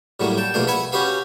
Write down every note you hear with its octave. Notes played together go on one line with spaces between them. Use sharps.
A2 F#3 G3 A3 A#3
G5 A5
A#1 B2 A3 A#3 D4 F5
B4 E5 F#5 G#5 B5
C#4 F#4 G4 B4 F5